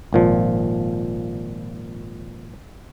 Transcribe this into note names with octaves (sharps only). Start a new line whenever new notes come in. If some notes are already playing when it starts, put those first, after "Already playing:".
G#1 A#2 F3